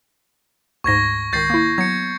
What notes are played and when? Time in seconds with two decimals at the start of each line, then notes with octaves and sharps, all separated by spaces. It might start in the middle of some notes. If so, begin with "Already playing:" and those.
0.84 D2 G#2 C#6 G#6 A#6
1.33 C#2 D#3 G6 A6 C7
1.50 A#3 E4
1.78 F#3 B3 G#6 C#7